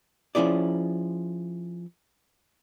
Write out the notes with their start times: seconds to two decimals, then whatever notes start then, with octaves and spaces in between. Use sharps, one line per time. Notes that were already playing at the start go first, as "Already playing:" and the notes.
0.35 F3 C#4 E4 G#4 D5